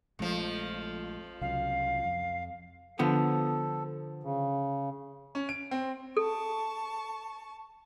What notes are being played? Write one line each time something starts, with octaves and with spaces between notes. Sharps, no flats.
A#1 F2 F3 G#3 A3
C2 C#3 F#3 F5
F2
D3 F3 B3 A4
C#3
C#4
D7
C4
A4 A5 C#6